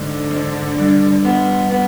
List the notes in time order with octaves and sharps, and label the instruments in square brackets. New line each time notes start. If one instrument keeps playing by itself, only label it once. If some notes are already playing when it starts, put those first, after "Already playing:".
Already playing: [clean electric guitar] G#2 [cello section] D3
[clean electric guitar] G#2
G2
B3
B3